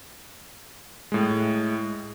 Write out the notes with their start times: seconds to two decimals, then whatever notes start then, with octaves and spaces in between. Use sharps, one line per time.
1.12 A2 G#3